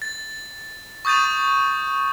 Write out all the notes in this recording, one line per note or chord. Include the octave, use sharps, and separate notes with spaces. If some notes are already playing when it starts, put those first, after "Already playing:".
A6
C#6 D#6 G6 A6 D#7